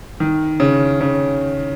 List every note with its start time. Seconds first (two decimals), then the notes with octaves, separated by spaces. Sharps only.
0.20 D#3
0.60 C#3
1.01 C#3